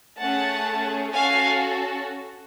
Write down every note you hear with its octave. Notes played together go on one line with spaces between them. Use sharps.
A3 C#4 G#4 F#5 A5
C#4 F#4 A4 F5 G#5